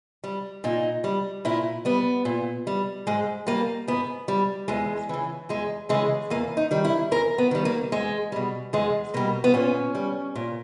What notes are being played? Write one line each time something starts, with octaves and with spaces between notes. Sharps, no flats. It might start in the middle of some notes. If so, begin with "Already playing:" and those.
G3
A#2 D#4
G3
A#2 E4
G3 B3
A#2
G3
G#2 G#3
G3 A#3
G#2 B3
G3
E2 G#3
C#3 E3
E2 G#3
C#3 E3 G#3
E2 A#3
D#4
D#3 G3
E4
E2 A#4
B3
D#3 G3
A#3
E2 G#3
B2 G3
E2 G#3
B2 G3 A#3
B3
A#2 C#4
G3
A#2